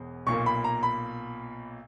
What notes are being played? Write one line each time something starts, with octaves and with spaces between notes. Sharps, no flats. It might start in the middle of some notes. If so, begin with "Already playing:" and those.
Already playing: E1 E2
B1 A#2 A#3 C#6
B5
A#5
B5